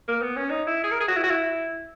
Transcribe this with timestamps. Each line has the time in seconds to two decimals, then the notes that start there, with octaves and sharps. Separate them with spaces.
0.08 A#3
0.22 B3
0.37 C#4
0.50 D#4
0.67 E4
0.84 G#4
0.92 A#4
1.00 G#4
1.08 F#4
1.16 E4
1.24 F#4
1.30 E4